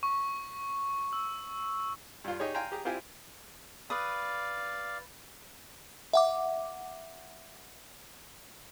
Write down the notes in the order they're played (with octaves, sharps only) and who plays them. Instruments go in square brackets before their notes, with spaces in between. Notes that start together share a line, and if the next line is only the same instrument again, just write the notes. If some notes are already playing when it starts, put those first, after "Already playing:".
[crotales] C#6
E6
[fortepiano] G2 F4
D#4 G4 G#4 C#5
F5 G5 G#5 A#5 C6
G4 G#4 A#5
C4 E4 F4 G4 G#5
[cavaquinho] B4 D#6 [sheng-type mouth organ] D5 F5
[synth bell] E5 F#5 D6